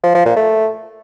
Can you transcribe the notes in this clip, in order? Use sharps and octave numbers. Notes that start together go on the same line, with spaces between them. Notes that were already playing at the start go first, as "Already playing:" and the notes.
F3
F3
A#2
A3